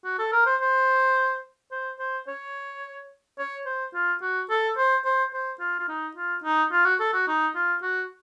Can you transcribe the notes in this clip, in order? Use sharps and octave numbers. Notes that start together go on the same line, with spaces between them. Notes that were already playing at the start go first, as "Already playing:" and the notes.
F#4
A4
A#4
C5
C5
C5
C5
C#5
C#5
C5
F4
F#4
A4
C5
C5
C5
F4
F4
D#4
F4
D#4
F4
F#4
A4
F#4
D#4
F4
F#4